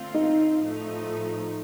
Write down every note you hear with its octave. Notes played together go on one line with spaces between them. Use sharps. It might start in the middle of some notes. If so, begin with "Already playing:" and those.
Already playing: D3 A3 C4 F4
D#4
A2 F3 A3 D#4